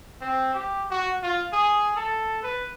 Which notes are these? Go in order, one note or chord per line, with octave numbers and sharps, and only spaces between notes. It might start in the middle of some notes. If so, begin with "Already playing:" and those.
C4
G4
F#4
F4
G#4
A4
B4